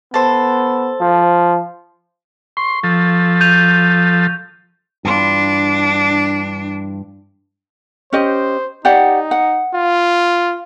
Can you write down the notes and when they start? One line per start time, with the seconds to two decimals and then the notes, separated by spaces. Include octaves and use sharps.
0.14 B3 A4 C5
1.00 F3
2.57 C6 C#6
2.83 F3 A4
3.41 G6 D#7 F7
5.05 G2 E3 D4 F4
8.13 C#4 G4 C5 D#5
8.85 D#4 G4 D5 F#5
9.31 F#5
9.75 F4